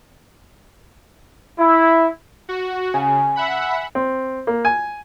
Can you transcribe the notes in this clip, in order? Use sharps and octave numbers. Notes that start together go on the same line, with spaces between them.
E4
F#4
C#3 G#5
E5 F#5 B5
C4
A#3
G#5